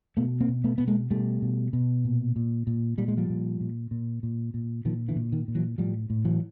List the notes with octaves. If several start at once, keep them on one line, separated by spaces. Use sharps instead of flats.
B2 A3 B3
A#3 C4
B2
A3 B3
B2 B3
G#3 A#3
B2 G3 A3
B2
B2
A#2
A#2
A#2
A#2 G3
G#3
F3 G3
A#2
A#2
A#2
A#2
A#2
A#2 D#3 F3
D3 E3
A#2
D#3
A#2
E3 F#3
A2 F3 G3
A2
E3 F#3